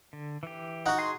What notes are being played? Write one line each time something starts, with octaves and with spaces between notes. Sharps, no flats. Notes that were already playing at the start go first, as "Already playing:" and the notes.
D3
E3 G4
D#4 F#4 F#5
G#4 C6